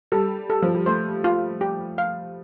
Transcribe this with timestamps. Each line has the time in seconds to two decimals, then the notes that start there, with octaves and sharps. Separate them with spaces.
0.12 G3 A4
0.50 A4
0.62 F3
0.74 G3
0.86 A3 C5
1.24 F4
1.61 G4
1.98 F5